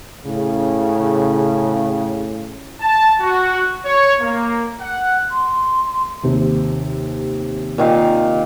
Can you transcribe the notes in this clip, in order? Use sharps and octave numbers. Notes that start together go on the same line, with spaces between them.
A2 C#3
A5
F#4
C#5
A#3
F#5
C6
D#2 C3
A#2 D#3 F5